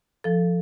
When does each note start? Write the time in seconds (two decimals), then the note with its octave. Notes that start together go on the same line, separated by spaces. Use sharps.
0.24 F3 A4